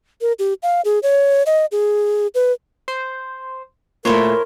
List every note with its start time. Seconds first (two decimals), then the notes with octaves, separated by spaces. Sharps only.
0.21 A#4
0.39 G4
0.63 F5
0.85 G#4
1.03 C#5
1.46 D#5
1.72 G#4
2.35 B4
2.88 C5
4.05 A#2 A3 E4 A#4 C5 C#5